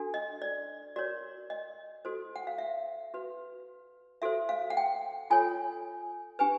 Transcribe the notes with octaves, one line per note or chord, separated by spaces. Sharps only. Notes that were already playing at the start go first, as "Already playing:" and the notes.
Already playing: D4 F#4 A4
D#5
D5
F#4 A#4 C#5 D5
D#5
F#4 A4 C5
F#5
F5
E5
F#4 B4
F#4 A4 C5 E5
F5
F#5
G5
F4 A4 C#5 G#5
D4 G4 B4 G#5